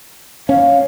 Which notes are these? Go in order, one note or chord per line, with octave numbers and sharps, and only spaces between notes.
C#4 F5